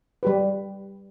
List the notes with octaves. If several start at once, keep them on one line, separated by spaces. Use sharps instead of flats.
G3 G4 B4